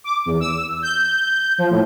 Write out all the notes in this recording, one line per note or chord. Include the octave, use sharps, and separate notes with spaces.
D6
E2
E6
G6
F3
A2